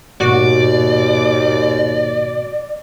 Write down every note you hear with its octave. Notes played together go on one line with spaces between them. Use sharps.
D#2 G#2 B2 F#4 D5